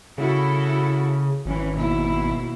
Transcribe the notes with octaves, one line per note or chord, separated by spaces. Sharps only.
C#3 E4 F#4 A4
G#1 E3 C#4
D#2 B2 E4